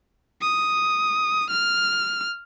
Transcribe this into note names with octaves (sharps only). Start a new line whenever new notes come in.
D#6
F6